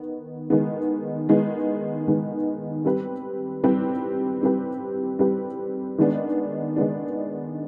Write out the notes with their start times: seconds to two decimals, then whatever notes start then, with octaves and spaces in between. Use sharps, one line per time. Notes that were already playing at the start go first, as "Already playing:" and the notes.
Already playing: D#3 B3
0.50 D#3 G#3 B3
1.29 D#3 G#3 B3
2.07 D#3 G#3 B3
2.85 G3 C4 G4 B4
3.64 G3 C4 G4 B4
4.42 G3 C4 G4 B4
5.19 G3 C4 G4 B4
5.98 D#3 G#3 B3 D4
6.76 D#3 G#3 B3 D4